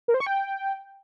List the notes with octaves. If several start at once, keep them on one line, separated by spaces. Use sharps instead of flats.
A#4
C5
C#6
G5